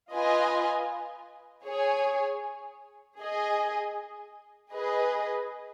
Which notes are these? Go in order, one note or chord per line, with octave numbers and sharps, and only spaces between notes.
F4 B4 D#5 G#5
G#4 C#5 G#5
G#4 D#5 G#5
G#4 B4 D#5